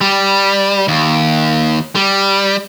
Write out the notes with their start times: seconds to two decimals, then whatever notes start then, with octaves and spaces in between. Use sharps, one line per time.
0.01 G3
0.88 D#2
1.95 G3